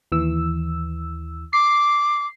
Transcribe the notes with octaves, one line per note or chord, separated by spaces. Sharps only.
D#2 E3 E6
D6 C7